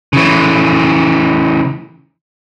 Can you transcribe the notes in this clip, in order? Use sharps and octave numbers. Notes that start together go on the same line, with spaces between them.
C#3 E3